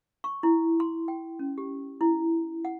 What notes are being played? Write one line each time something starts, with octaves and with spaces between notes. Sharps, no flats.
C#6
E4
C6
G5
C#4
G4
E4
F#5